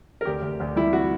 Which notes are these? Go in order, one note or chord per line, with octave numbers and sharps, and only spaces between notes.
A#4
D2 G4
D2
D2
G3 E4
F#4